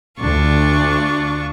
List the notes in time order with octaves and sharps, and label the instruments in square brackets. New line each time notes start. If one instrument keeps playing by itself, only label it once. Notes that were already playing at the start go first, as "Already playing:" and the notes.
[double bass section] D2 [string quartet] D4 F4 C#6